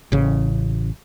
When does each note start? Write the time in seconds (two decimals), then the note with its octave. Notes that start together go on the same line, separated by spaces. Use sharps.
0.12 A1 C#3